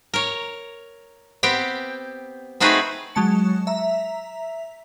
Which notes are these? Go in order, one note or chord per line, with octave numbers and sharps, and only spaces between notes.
A#4 C#5
B3 C4 G4 G5
A3 C4 D#4 F#4 G#4 B4
F#3 G#3 A5 C#7
E5 A#5